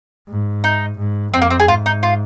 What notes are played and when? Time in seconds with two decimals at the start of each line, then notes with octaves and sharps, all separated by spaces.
0.28 G#2
0.64 D#4
0.98 G#2
1.33 F2 C4
1.42 A#3
1.50 C4
1.60 G#4
1.68 G#2 F4
1.86 D#4
2.03 F4